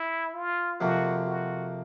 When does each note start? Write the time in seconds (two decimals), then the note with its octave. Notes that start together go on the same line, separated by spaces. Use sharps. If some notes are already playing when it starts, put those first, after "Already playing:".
Already playing: E4
0.34 F4
0.80 F2 C3 F3 A#3 F#4
1.26 F#4